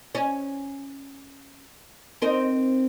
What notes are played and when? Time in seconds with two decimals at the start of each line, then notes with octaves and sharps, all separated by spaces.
0.15 C#4
2.22 C4 D#4 A#4